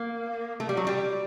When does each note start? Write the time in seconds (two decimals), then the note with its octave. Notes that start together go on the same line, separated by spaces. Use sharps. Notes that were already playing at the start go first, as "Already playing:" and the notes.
Already playing: A#3
0.60 A3
0.69 G3
0.77 F#3
0.87 G3